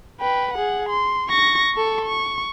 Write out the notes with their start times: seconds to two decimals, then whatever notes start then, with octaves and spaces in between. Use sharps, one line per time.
0.20 B4 G5
0.54 G#4 F#5
0.89 C6
1.29 C#6 A#6
1.74 A4 C#6
2.05 C#6